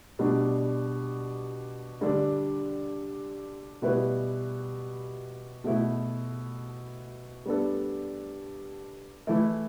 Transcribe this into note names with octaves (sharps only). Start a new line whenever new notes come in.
B2 G3 D4
D3 G3 D4 A4
B2 G3 E4 B4
B2 A3 E4
G3 B3 D4 A4
E3 A3 E4